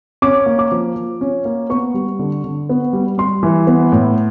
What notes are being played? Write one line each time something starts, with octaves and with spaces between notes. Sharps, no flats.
C#4 D6
A#3
D6
F3
F3
C#4
A#3
B3 C#6
G3
D3
D3
B3
G3
G3 C6
E3
B3
A2